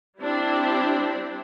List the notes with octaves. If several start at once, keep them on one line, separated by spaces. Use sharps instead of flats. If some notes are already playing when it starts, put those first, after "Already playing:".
G3 C4 D4 E4